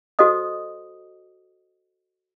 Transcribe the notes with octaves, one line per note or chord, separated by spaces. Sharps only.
F#4 A4 C5 D#5 D#6